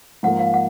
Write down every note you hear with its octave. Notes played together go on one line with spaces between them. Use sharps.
G#2 F3 A#3 F#5
F5
F#5